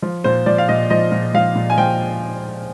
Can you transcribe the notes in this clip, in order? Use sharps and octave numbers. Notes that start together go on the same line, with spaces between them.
F3
A#2 C5
F3 D5
F5
A#2 D#5
F3 D#5
A#2
F3 F5
A#2
G#5
F3 G5